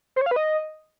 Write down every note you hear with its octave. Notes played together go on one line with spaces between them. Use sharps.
C5
C#5
F5
B4
D#5